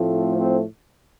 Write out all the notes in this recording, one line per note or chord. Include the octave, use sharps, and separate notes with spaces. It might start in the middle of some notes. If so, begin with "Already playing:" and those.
Already playing: A2 F3 A3 C4
C4